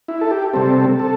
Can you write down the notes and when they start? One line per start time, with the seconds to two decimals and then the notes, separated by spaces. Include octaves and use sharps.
0.08 E4
0.21 A4
0.31 G4
0.53 C3 G3 C4 A4
0.99 A4